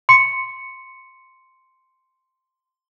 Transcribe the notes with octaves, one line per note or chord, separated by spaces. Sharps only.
C6 C#7